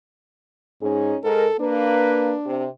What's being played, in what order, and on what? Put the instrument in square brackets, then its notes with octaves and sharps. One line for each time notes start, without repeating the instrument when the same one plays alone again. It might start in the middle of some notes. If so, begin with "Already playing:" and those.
[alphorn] G#2 [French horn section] C#4 D#4 G#4
[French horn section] G#2 A#4 [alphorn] A4
[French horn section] A#3 B4 [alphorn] D4
[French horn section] C3 C4